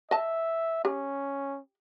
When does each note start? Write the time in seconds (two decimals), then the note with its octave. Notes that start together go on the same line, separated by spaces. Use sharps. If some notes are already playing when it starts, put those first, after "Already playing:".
0.11 D#5 E5 A5
0.85 C#4 G4